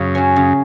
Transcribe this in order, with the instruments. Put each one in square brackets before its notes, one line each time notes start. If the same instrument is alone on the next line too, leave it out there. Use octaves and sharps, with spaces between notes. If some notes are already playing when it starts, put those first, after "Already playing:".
Already playing: [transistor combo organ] F#2 [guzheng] C#3
[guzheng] F#3 C#4
C#3